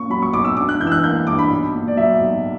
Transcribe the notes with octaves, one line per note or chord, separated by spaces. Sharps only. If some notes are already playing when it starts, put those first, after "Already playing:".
Already playing: A#2 C#4 C#6
F#3 B5
C#6
B1 D6
E6
D4 D6
F#6
E3 G6
E6
F#6
A#3 G6
G2 D6
B5
B1
A#2
D5
F#3 E5
B1